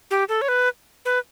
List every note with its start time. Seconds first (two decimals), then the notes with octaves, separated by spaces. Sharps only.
0.11 G4
0.29 A4
0.42 C#5
0.48 B4
1.05 B4